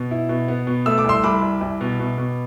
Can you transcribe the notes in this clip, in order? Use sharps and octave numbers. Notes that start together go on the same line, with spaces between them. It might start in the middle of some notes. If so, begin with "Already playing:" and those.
Already playing: B2
E4
B2
B3
B2
A3 E6
D6
C2 C6 E6
C2 B5 D6
C2
C2
B2
B2
B2